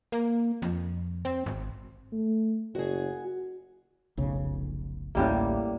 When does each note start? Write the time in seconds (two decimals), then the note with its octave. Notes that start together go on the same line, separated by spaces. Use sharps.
0.12 A#3
0.62 F2
1.25 C4
1.46 G#1
2.12 A3
2.75 F#1 F#4 G#4
4.17 F1 B1 C#3
5.15 A1 D2 A2 G3 A#3 C#4